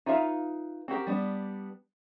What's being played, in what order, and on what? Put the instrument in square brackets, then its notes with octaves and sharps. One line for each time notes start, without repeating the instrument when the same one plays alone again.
[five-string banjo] D#4 F4 B4 E5 F5
C4 F#4 G4 A#4
G3 B3 D4